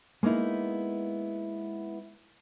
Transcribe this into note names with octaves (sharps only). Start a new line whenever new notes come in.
G#3 A#3 B3 D#4 E4